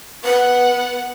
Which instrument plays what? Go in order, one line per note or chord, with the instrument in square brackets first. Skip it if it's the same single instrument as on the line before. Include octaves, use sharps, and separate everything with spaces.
[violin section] B3 F#5 [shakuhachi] B4